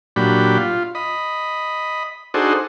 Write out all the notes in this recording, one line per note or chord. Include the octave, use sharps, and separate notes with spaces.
A#2 F#3 D4 G4 B5
F4
D#5 B5
D4 D#4 F#4 G#4 A4 C5